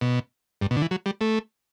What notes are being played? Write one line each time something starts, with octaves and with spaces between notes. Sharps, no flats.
B2
G2
B2
D3
E3
F#3
G3
A3